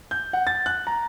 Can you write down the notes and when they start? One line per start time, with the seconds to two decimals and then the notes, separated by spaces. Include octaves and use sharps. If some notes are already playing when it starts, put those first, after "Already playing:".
0.11 G6
0.33 F#5
0.47 A6
0.66 F#6
0.87 A#5